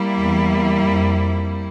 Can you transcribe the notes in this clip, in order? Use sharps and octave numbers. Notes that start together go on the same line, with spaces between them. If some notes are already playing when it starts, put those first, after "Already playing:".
Already playing: G3 A#3 E4
E2
F2